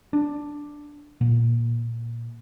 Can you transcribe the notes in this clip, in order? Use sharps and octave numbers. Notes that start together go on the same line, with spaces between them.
D4
A#2